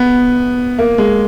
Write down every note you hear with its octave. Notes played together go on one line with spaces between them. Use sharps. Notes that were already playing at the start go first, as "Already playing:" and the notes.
Already playing: B3
A#3
G#3